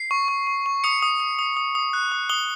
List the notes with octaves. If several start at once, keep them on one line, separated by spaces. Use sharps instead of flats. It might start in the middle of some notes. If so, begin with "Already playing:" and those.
Already playing: C7
C#6
C#6
C#6
C#6
D#6 C#7
D#6
D#6
D#6
D#6
D#6
F#6
D#6
D#6 G7